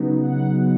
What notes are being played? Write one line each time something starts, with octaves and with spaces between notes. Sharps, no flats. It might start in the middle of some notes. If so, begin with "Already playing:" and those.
Already playing: C#3 F#3 B3 D#4
F#5
D#4